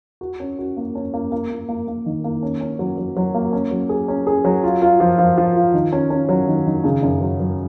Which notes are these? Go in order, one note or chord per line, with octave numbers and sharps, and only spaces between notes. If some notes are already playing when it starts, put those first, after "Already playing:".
F#4
C#4
F#4
A#3
C#4
A#3
A#3
A#3
A#3
A#3
D#3
A#3
C#4
C#4
F#3
F#3
F#3
A#3
C#4
F#3
G#4
C#4
G#4
F#3
F4
F4
F3
F3
F3
F4
D#3
C#4
C#4
F#3
D#3
D#3
C#3
F#2
F#3
F#3